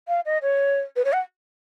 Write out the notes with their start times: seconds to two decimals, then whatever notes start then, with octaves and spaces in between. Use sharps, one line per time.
0.08 F5
0.26 D#5
0.42 C#5
0.96 B4
1.05 C#5
1.13 F#5